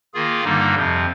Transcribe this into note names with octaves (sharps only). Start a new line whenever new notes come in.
D#3 A#3 F4 G#4
G2 D3 G3 A#3 D#4
F2 C3 F3